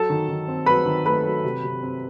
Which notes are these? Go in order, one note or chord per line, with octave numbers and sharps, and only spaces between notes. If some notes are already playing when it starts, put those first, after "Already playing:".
Already playing: F#3 A4 A5
D#3
D#3
C4
F#3 B4 B5
D#3
A3 B4 B5
F#3
C3
C3
C4